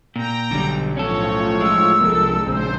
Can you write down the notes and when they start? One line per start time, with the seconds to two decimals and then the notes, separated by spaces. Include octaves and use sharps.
0.16 A#2 G5 A#5
0.51 B1 D3 G3
0.97 A2 F3 C#4 A4 C#5
1.61 G#3 E6
2.01 C2 F3 A#3 A4
2.46 A#1 C#3 C5